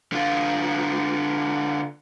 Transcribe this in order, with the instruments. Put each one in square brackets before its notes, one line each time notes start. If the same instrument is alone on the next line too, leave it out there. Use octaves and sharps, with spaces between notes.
[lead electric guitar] D3 F4